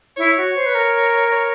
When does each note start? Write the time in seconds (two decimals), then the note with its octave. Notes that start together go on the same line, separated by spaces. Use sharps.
0.17 E4 C#5
0.37 F#4
0.56 C5
0.66 B4
0.75 A#4
1.32 C#5